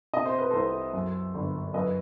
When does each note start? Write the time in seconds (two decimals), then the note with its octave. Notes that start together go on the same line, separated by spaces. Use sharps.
0.13 C3 D#5
0.25 C5
0.39 B4
0.51 C2 A4 C5
0.93 F#2
1.35 G1
1.74 F#2 B4 D#5